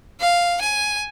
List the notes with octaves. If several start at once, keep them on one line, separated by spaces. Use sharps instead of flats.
F5
G#5